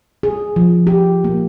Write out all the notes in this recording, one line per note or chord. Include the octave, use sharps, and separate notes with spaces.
G#4
F3
G4
A#3